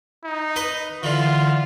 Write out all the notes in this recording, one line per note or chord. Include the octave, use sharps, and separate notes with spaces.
D#4
B4 D#5
D3 E3 F4